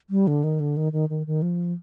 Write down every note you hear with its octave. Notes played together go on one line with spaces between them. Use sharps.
G3
D3
D#3
D3
D#3
D#3
D#3
D#3
F3